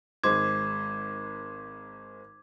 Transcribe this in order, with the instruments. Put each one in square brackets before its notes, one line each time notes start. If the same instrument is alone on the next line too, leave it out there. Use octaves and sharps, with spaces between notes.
[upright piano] G#1 G#3 C5 [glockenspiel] D6 G#6